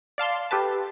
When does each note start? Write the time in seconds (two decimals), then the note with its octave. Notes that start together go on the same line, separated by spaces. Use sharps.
0.18 D5 F5 A5 C6
0.51 G4 A4 B4 A5